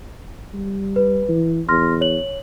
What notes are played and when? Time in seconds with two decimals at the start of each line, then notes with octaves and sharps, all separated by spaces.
0.54 G3
0.96 B4
1.29 E3
1.69 E2 C6 F6 A#6
2.01 C#5 F#7